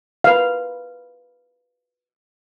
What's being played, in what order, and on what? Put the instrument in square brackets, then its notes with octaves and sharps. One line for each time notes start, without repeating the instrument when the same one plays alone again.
[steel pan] B4 F5